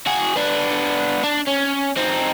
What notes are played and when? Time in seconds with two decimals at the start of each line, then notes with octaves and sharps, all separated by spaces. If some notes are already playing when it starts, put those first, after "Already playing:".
0.07 F#4 G#4
0.36 B3 D4
1.24 D4
1.48 C#4
1.97 C4 D#4